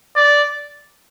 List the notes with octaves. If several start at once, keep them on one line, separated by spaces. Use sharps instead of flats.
D5